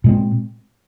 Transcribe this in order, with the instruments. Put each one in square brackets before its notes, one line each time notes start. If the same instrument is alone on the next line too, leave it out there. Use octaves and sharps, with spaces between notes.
[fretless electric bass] A#2 G#3 C4